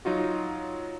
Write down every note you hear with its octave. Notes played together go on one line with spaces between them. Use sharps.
F#3 D#4 F4 F#4